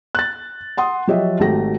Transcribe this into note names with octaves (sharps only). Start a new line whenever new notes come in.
F#6 A6
F#5 C6 D#6
F3 F#3 G4 C#5 D#5 E5
G#1 A3 F#4 G4 A#6